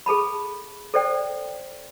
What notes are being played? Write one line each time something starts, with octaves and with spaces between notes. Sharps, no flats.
G#4 A4 A5 B5
A4 C5 D5 G5